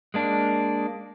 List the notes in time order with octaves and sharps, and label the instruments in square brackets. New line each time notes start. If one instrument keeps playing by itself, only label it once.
[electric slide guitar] G#3 A#3 D4